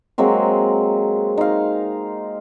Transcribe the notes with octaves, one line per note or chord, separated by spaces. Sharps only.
F#3 G#3 A#3 C4
D#4 F5